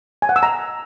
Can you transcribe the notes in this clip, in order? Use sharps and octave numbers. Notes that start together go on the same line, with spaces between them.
G#5
F#5
E6
A#5